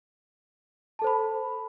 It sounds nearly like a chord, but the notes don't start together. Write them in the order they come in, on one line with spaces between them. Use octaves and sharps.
A5 A4 C5 B5